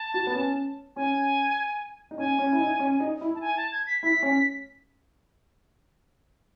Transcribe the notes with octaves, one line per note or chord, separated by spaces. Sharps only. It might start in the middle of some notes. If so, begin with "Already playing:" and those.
Already playing: A5
F#4
B3
C#4
C#4 G#5
D#4
C#4 G#5
C#4
E4
D#4
C#4
D#4
E4
A5
G#5
A5
G#6
B6
E4 B6
C#4